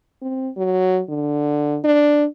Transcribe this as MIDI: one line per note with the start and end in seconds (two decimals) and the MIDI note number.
0.22 0.49 60
0.57 1.01 54
1.09 1.79 50
1.84 2.26 62